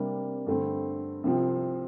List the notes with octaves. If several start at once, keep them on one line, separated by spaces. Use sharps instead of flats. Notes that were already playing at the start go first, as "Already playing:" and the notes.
Already playing: C3 G3 A#3 D4
G2 D3 A3 C4
C2 C3 F3 C4